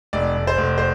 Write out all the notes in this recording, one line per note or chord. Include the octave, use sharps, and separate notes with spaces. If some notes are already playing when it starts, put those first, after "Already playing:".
F1 D5
F1
C5
F1
C5